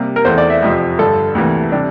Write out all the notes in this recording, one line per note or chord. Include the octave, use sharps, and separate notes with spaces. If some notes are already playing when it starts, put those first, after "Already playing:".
Already playing: C3 G3 A#3
A#4
E2 E3 A3 C4 C5
D5
E5
F2 C3 F3
G2 D3 A3 A4
D2 C3 E3 A#3
C3 G3 D4